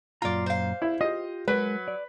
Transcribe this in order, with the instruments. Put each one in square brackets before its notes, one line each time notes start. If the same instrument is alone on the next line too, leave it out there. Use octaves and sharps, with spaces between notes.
[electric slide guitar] F#2 A#2 A#5 [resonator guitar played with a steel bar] F4 D5
[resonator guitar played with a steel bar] C5 F5
[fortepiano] E4
[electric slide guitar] F4 G4 [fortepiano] D#5
[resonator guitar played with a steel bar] F#3 [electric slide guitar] G#3 A#4 [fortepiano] B4
[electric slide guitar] D5